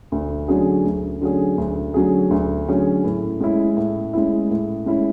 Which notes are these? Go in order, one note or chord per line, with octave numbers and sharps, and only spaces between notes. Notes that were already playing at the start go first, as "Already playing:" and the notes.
D2
D3 F#3 C#4 G#4
D2
D3 F#3 C#4 G#4
D2
D3 F#3 C#4 G#4
D2
D3 F#3 C#4 G#4
A2
G#3 C#4 E4
A2
G#3 C#4 E4
A2
G#3 C#4 E4